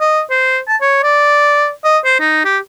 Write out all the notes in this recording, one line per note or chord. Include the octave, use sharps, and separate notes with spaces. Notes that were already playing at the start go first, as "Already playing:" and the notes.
D#5
C5
A5
C#5
D5
D#5
C5
D#4
G4